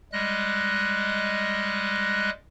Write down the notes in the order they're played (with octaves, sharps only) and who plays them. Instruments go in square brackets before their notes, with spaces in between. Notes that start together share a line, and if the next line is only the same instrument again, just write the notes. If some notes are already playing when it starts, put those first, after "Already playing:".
[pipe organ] G3 G#3 D#5 F#6